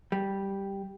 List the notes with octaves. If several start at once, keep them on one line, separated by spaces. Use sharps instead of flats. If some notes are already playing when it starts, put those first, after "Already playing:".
G3